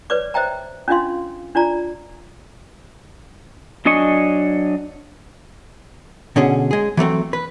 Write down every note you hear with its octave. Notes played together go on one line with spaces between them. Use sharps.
B4 C#5 D5 D6
C5 D#5 E5 G5 A#5
C#4 D4 F4 D#5 F5 C6
D4 F4 D5 A#5
F#3 D4 D#5 G#5 C#6
B2 D3 C#4 G#4
G#3 G#4
E3 F#3 A3 C4
B4